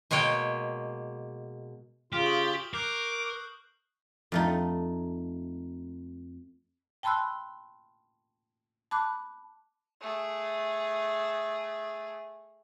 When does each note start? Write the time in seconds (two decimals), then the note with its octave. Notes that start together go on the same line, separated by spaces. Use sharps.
0.11 B2 G#3 A#3 C#5 G5
2.13 C#3 F4 G4 F6
2.26 C#6 D#6 F#7
2.74 A#4 D6 F#6 G6 C7
4.32 F2 A3 D#4
7.03 G5 A5 B5 C6 E6 F#6
8.91 A5 B5 D6 F#6
10.01 A3 G#4